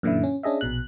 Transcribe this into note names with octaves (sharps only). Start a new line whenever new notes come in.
F#2 A#2 D3 E3 E4
C#4
C#4 D4 G#4 D#5 E5
A#1 B2 F#6